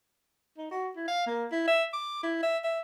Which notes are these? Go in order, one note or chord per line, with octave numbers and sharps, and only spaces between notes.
D#4
F#4
E4
F5
A#3
E4
E5
D6
E4
E5
E5